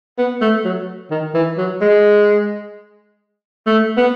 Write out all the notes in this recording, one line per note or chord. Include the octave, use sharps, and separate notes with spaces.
B3
A3
F#3
D#3
E3
F#3
G#3
A3
B3